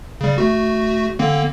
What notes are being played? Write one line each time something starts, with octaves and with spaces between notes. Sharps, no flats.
C#3 G3
A3 F#4
D3 A#3 C4